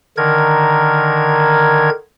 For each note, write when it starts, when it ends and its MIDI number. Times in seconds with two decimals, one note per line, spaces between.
0.17 1.90 50
0.17 1.90 51
0.17 1.90 70
0.17 1.90 92